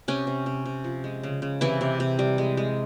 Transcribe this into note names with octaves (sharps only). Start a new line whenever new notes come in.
C3 C#4
C3
C3
C3
F3
G#3
C#3
C#3
C3 E3 E4
C3
C3
G3
G#3
G#3